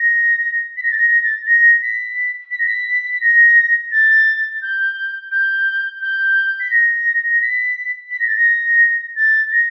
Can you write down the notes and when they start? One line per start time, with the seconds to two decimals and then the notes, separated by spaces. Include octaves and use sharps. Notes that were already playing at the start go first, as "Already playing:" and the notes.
Already playing: A#6
0.77 B6
0.83 A#6
0.91 A6
0.97 A#6
1.11 A#6
1.24 A6
1.46 A#6
1.82 B6
2.51 B6
2.59 A#6
2.66 B6
3.13 B6
3.21 A#6
3.91 A6
4.62 G6
5.31 G6
6.01 G6
6.60 B6
6.70 A#6
7.30 A#6
7.42 B6
8.11 B6
8.19 A#6
8.27 A6
8.36 A#6
9.16 A6
9.51 A#6